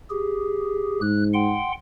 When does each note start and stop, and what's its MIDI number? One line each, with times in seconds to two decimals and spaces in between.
0.10 1.00 67
0.10 1.00 68
1.01 1.58 44
1.01 1.23 90
1.34 1.72 78
1.34 1.72 79
1.34 1.72 84